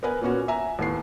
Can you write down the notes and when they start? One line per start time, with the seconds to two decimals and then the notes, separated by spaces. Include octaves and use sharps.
0.03 B3 A#4 B4 G#5
0.21 A#2 B3 C#4 F#4
0.48 E5 G#5 A#5
0.79 D#2 A2 B3 C7